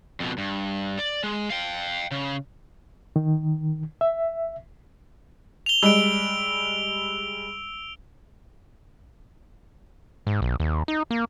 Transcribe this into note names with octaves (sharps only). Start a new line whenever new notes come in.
F2 B2
G2
D5
G#3
F5 G5
C#3
D#3
E5
F7 G7
G3 G#3 E6 D7
G#2
B1
D#2
D#4
A#3